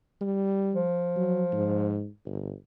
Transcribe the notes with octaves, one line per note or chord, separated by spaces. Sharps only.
G3
F3
F#3
G#2
G1